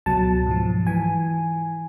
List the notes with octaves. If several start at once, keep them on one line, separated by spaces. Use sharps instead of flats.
C#2 B2 F#3 A5
G#2 F3
E3 G#5